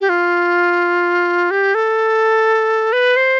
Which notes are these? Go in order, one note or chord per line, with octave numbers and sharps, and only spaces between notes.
G4
F4
G4
A4
B4
C5